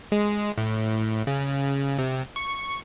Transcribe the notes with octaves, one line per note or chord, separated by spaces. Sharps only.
G#3
A2
C#3
C3
C#6